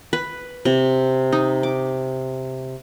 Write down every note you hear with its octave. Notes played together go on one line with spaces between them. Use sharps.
B4
C3
D#4
D6